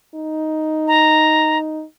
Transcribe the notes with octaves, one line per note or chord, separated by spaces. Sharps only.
D#4
A#5